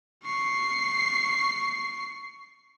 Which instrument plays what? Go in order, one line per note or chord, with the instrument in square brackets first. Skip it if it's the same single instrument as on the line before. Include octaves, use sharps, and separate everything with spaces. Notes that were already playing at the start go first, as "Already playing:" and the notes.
[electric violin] C#6 C7